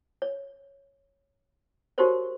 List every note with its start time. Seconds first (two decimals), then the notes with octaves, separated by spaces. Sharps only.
0.22 C#5
1.98 D#4 F#4 G4 A#4 C5 C#5